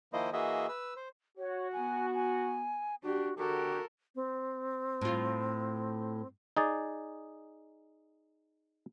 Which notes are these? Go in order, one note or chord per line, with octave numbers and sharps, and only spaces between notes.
D#3 F3 A#3 E4 C5 D#5
E3 A#3 F#4 G#4 D#5 E5
B4 E6
C5
F#4 C#5
B3 G#5
G#5
D4 F#4 G4
D3 F#4 G4 A4 A#4
C4
A2 F4
D#4 G#4 D5